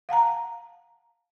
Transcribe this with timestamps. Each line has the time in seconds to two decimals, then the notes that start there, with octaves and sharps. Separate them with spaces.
0.09 F5 F#5 A5 A#5